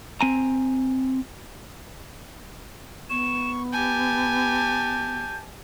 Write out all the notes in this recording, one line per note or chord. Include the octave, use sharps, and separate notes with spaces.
C4 G#5 A#5
B3 C#6 E7
G4 G#5 A5 G6